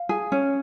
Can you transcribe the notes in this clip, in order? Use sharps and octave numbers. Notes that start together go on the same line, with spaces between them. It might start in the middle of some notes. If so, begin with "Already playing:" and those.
Already playing: F5
G#4
C#4